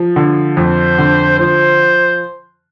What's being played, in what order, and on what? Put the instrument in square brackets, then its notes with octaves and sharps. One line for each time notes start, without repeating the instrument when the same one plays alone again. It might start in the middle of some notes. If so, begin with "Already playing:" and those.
Already playing: [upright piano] F3
D3
[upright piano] F2 [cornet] C5
[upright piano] D3
[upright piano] F3 [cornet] C5